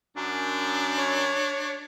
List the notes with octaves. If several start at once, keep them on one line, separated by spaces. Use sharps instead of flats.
F#2 D4
C#5